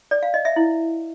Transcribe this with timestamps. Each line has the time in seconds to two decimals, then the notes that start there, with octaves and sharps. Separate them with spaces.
0.11 D5
0.23 F5
0.34 D#5
0.45 E5
0.56 E4